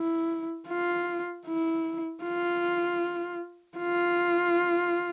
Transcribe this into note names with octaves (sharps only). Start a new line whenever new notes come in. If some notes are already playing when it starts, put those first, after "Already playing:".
Already playing: E4
F4
E4
F4
F4